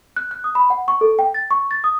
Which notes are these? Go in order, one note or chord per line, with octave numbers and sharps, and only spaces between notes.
F#6
F#6
D#6
B5
F#5
C#6
A4
G5
A6
C#6
A6
D#6